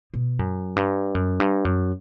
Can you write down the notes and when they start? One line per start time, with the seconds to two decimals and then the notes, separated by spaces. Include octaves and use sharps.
0.14 B2
0.39 F#2
0.76 G2
1.15 F#2
1.40 G2
1.65 F#2